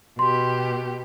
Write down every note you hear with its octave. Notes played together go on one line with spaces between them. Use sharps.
B2 G4 C6